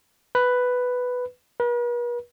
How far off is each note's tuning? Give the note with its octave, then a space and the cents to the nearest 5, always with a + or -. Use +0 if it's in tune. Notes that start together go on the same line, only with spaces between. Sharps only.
B4 +5
B4 -45